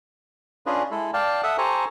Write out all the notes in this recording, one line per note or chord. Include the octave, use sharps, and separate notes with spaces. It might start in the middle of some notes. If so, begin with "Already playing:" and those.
C#4 D4 F4 G#4 B4 D#5
G#3 E4 A4
D5 F5 G5 A5
A4 E5 F#5 D#6
G4 A4 C5 G#5 A#5 C#6